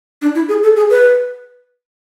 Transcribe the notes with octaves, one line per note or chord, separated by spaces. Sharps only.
D4
E4
G#4
A4
G#4
B4